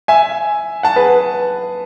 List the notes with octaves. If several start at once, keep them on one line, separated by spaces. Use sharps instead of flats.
E5 G#5
F#5 A5
G#4 B4